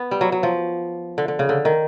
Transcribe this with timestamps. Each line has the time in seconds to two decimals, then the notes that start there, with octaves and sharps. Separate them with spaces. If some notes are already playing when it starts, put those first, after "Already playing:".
Already playing: B3
0.11 G3
0.21 F#3
0.32 F#3
0.43 F3
1.18 D3
1.28 D3
1.39 C#3
1.49 D3
1.65 D#3